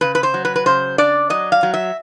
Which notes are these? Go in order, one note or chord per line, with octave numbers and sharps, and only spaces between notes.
C#3 B4
B4
C5
F#3
B4
B4
C#3 C5
D4 D5
F#3 D#5
F5
F#3
E5